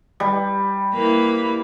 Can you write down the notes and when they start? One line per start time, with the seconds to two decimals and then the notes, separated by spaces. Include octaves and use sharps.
0.20 G3
0.94 A#3 E4 B4